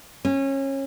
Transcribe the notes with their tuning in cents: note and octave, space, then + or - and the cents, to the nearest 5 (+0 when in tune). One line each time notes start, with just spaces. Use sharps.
C#4 -25